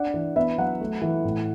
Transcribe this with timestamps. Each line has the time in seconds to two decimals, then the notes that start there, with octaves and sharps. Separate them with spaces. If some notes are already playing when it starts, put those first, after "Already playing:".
Already playing: D4 F#5
0.14 E3
0.36 B3 E5
0.58 F#3 F#5
0.81 A3
1.02 E3
1.24 A2